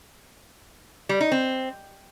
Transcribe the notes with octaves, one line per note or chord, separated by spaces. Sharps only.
G3
D#4
C4